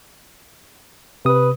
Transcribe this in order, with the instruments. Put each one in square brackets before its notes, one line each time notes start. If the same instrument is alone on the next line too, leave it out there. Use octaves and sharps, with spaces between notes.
[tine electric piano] C3 D#6 [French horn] B4